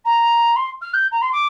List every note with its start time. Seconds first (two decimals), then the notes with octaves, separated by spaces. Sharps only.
0.05 A#5
0.56 C6
0.81 F6
0.93 G6
1.11 A#5
1.21 C6
1.32 D6